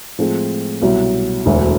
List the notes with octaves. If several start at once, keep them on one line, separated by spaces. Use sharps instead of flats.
A2 F3 G#3 C4
C2 B2 F#3
E1 D2 D3 F#3